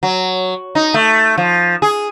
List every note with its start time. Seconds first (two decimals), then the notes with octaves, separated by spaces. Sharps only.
0.03 F#3
0.75 D#4
0.94 A3
1.38 F3
1.82 G#4